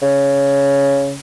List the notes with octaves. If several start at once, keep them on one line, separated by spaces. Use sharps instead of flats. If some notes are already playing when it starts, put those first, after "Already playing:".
C#3